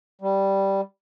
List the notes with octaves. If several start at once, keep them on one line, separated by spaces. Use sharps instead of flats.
G3